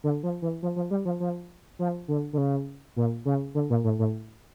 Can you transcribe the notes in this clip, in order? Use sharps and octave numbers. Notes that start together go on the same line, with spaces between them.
D3
F3
E3
F3
F3
G3
F3
F3
F3
D3
D3
C#3
A#2
C#3
D3
A#2
A2
A2